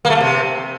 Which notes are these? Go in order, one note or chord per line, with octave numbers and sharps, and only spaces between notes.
A#3
A3
A#3
C3